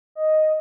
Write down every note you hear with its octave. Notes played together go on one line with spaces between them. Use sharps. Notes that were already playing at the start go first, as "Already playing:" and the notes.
D#5